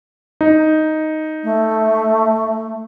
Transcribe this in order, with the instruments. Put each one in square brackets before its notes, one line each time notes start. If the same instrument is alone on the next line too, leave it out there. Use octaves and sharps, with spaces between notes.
[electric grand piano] D#4
[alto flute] A3